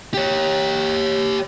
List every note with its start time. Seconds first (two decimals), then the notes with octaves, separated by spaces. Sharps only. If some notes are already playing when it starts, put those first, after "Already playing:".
0.14 G4 C#5